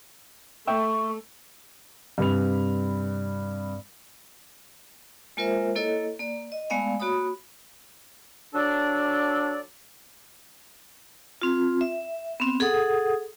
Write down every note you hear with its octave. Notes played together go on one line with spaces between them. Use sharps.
A3 E5 G5 C#6
G2 C3 B4 B5 F7
G#3 A#3 F4 A#4 C5 E5
A#3 E4 A4 C#5 D#5
A#3 D5
D#5
G#3 A3 B3 D5 F5 G#5
A#3 F#4 C#5 B5 D#6
F#3 D4 A4 D5
C4 F4
E5
B3 C4
G#4 A4 F#5 D#6